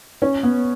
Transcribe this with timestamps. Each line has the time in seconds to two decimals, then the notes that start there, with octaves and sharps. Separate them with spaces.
0.22 C#4
0.43 B3